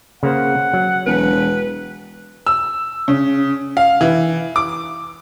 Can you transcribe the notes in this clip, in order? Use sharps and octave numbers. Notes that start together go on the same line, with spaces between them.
C#3 A#3 C5 F#5
F#3
E1 B4
E6
C#3
F5
E3
D6